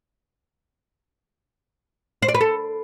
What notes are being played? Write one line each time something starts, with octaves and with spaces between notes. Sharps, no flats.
C5
D5
B4
A4